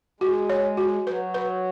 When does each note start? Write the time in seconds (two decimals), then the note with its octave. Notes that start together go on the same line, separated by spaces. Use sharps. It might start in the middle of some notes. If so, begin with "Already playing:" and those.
0.20 G#3 F#4
0.50 C#5
0.77 F#4
1.06 F#3 B4
1.34 B4